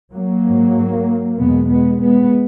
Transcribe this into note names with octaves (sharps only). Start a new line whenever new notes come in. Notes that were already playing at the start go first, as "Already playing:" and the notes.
F#3 A#3
G#2
E2 B2 G#3 B3
G#3 B3
G#3 B3